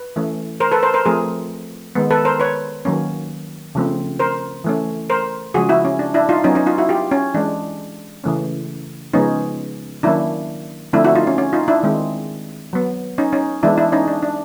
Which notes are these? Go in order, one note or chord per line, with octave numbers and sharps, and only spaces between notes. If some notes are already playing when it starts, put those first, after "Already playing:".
Already playing: B4
E3 A3 C#4
A#4 C5
A4 B4
A#4 C5
A#4 C5
F3 A3 C4 G#4 A#4
D#3 G#3 B3
A4 B4
A#4 C5
B4 C#5
D#3 F#3 A#3 C#4
C#3 F3 A3 C4
A#4 C5
E3 A3 C#4
A#4 C5
C#3 F3 G#3 F#4 G#4
E4 F#4
C#4
D4
D4 E4
D#4 F4
F#3 B3 C#4 D#4
C#4 D#4
D#4 F4
E4 F#4
F4 G4
C#4
E3 G#3 C#4 D4
C#3 E3 A3 C#4
C#3 F3 G#3 B3 C#4 D#4
D#3 F#3 A#3 C#4 D4 E4
D3 F3 A3 C4 D4 E4
E4 F#4
D#4 F4
C#4
C#4
D#4 F4
D4 E4
D#3 G#3 C4
F#3 B3
C#4 D#4
C#4 D#4
E3 G#3 B3 D4 E4
D4 E4
C#4 D#4
D4
D4